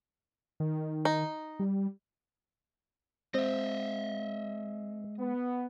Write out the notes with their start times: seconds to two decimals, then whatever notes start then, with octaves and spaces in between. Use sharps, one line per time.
0.60 D#3
1.05 D#4
1.60 G3
3.34 G#3 C4 D#5 E5
5.19 B3